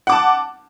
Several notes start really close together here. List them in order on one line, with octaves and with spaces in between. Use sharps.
F#5 D6 A5